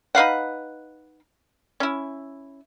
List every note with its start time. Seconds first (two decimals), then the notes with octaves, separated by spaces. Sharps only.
0.15 D#4 B4 F5 F#5
1.80 C#4 E4